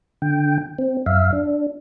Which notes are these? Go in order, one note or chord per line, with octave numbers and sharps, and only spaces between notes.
D3 G5
C4
F#2 E5 F5
D4